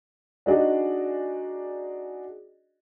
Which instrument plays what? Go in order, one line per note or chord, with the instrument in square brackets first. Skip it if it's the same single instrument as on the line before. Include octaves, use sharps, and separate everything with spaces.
[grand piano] D4 D#4 F#4 G#4 D5 D#5